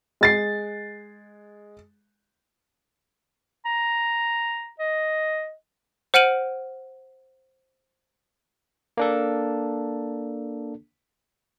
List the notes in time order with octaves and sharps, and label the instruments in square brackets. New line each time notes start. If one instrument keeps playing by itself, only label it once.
[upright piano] G#3 A6 C7
[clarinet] A#5
D#5
[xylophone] C5 F#5 F6 D7 D#7 F#7
[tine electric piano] A#3 D4 A4